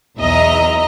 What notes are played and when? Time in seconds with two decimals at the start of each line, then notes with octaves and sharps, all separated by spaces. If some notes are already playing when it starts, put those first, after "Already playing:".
0.17 B1 E2 D#5 E5 A#5